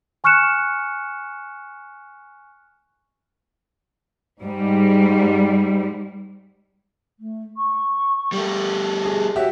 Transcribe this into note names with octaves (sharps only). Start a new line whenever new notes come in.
G#5 C#6 F6 F#6 C#7 E7
G#2 G3
A3
C#6
G3 A3 G5
G#4 A4
F#4 G4 C#5 E5